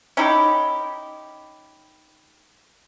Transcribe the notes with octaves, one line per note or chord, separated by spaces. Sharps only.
C#4 D#4 E4 G4